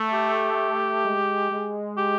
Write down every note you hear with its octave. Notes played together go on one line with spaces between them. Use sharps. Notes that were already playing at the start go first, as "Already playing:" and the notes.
Already playing: A3
G4
G#3
G#3
G4